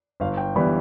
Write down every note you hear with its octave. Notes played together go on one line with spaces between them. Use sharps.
G1 F5
G5
G2 E3 G3 B3 B5